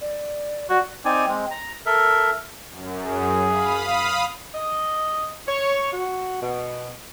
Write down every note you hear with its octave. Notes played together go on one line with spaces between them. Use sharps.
D5
F#4 D5
C4 D#4 D5 G#5
G#3 C4
A#5
A4 A#4 E5
F#2
G#4
F5 B5 D#6
D#5
C#5
F#4
B2